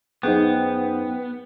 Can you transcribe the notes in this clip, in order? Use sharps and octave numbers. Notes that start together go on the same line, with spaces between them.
F#2 B3 D#4 G#4 C5 F#5 G5